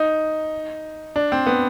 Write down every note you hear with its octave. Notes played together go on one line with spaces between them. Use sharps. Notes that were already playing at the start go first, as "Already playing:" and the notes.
Already playing: D#4
D4
C4
B3